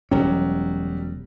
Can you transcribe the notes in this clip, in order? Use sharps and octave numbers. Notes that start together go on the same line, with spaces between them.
E1 F#3 G3 C#4